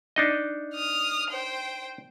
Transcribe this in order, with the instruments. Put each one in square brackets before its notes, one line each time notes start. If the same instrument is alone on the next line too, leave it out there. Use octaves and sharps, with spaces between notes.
[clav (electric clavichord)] D4 D#4 D#5
[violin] D#6 F6
C5 G5